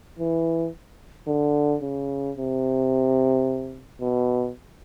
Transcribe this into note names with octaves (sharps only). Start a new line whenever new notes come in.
E3
D3
C#3
C3
B2